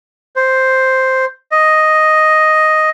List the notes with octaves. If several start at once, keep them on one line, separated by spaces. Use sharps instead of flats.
C5
D#5